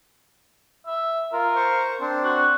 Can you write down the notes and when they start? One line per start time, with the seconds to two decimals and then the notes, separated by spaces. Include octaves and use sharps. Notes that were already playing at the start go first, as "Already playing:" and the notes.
0.87 E5
1.33 F4 A#4
1.56 C5 C#6
2.00 C4 D4
2.23 F#4